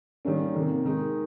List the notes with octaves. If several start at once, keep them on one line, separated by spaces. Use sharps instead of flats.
D#3 G3 A#3 C#4
C3 D#3 A#3
D#3 G#3 D#4